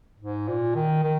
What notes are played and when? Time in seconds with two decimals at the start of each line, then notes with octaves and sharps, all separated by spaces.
0.20 G#2
0.48 A#2
0.75 D#3
1.03 D#3